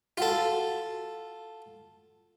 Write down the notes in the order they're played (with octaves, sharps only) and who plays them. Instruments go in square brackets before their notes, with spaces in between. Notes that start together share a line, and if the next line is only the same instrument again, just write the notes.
[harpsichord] F4 A4 [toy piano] F#4 F#5